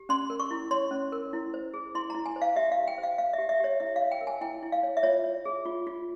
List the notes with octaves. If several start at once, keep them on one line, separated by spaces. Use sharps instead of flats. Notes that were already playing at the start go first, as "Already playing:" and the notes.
Already playing: G4
C#4 C6
A#4
C#6
E4
C#5 C6
C#4
A#4
E4
C5
G#4
E4 C6
E4 A#5
G#5
C5
F5
G4 E5
F5
G4
G5
C5
F5
C5 F5
G4 E5
E5
G4 C#5
E4 E5
F5
C#5
G5
A#4
G#5
E4 G5
E4
F5
C#5
E5
F4 C#5
C#5
G#4
F4
F4